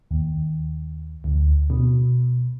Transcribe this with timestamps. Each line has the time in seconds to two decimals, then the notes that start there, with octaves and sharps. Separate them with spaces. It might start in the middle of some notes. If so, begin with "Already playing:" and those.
0.11 D#2
1.24 D2
1.70 B2